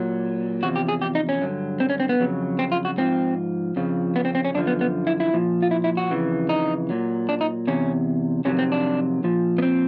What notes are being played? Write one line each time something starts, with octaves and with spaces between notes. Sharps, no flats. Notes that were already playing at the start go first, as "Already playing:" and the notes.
Already playing: A#2 F#3
E2 C3 F3 F#4
G4
G#4
G4
D#4
C#4
G2 D3 F#3
C4
C#4
C4
B3
F2 C#3 F#3
C4
F4
F#4
G#2 F3 C4
F2 C#3 F3
B3
C4
C4
C#4
F#2 D3 F3 D4
B3
B3
E4
E4
A#2 F3
F4
E4
E4
F#4
F2 C#3 E3
D#4
A#2 F#3
D4
D#4
E2 C3 C#4
F2 C3 D#3 F#3 C#4
C4
D4
A#2 F3
B3
C4